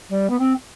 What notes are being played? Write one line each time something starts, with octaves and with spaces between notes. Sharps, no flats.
G3
B3
C4